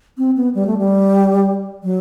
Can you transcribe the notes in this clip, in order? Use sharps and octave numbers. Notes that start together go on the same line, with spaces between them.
C4
B3
G3
A3
G3
F#3